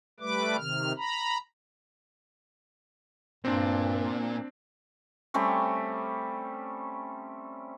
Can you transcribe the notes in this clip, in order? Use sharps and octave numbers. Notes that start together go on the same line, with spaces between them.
G3 A3 B4 D6
C3 D#3 F6
A#5 B5
G2 A#2 C4 D4
G3 A3 C4 C#4